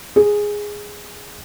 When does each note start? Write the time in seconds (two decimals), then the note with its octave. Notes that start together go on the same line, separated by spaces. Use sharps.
0.16 G#4